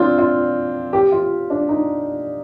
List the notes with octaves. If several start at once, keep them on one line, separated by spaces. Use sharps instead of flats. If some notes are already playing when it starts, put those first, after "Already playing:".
Already playing: C4 D4 F4
F4
G4
F4
D4
D#4